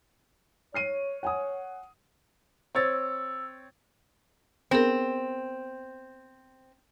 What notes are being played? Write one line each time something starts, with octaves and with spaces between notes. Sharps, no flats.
C#5 F6 C7 D#7
F#5 G#5 D#6
C4 C#5 E6 A6
B3 C4 G#4 A#4